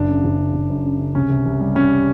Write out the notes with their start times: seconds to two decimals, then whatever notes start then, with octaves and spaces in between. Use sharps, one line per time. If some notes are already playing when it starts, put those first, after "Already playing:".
Already playing: F#1 D4
0.08 C#3
0.24 F#1
0.38 C#3
0.54 F#1
0.70 F#2
0.85 C#3
0.99 C#3
1.15 C2 C#4
1.29 C2
1.46 C2
1.61 G3
1.75 G3 C#4